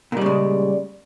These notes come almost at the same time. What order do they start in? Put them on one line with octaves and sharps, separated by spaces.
A#2 G3 C#3 G#3